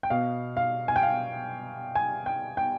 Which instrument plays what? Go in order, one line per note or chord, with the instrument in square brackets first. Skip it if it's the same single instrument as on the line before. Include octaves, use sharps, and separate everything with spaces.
[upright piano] G5
B2 B3 F5
F5
G#5
G5
F5
G#5
G5
G5